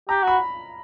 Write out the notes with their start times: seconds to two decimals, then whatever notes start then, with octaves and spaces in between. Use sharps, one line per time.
0.09 G4 A#5
0.23 F#4 B5